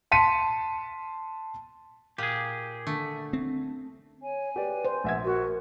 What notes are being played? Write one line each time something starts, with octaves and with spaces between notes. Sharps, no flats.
A5 C6 B6 C#7 D#7
A#2 G4 G#4
D3 A3
C4
C#5 G#5
G4 B4 D5
C5
A#1 E5 F#5 G#6
F#4 A#4